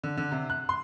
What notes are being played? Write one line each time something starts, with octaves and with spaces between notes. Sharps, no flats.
D3
D3
C3
F#6
C6